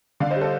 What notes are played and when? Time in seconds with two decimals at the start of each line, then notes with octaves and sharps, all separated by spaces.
0.20 D3 D5 F5
0.31 C5 D#5
0.36 G3
0.41 A4 C5